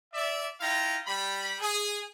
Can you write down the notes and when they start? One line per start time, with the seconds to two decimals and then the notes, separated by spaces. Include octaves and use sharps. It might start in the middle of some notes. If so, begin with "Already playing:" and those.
0.13 D5 E5
0.60 E4 F4 F5 G5 A#5
1.06 G3 B5
1.60 G#4